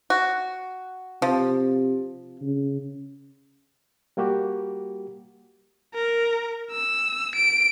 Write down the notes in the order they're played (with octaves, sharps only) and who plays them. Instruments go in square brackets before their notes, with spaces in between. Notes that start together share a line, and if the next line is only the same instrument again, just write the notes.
[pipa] F#4
[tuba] C3 [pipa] F3
[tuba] C#3
[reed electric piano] G3 A#3 F#4 G4
[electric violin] A#4
E6
D7